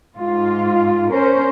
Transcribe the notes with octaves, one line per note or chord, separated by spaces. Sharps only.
G#2 F4
C#4 A#4 C5